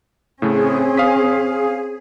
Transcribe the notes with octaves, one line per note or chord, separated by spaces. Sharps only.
A2 C#3 A3 C4 C#4 G#4
F5 D#6 B6